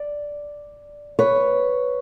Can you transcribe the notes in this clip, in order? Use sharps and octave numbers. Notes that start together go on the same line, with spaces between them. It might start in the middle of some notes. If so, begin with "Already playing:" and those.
Already playing: D5
B4 C#5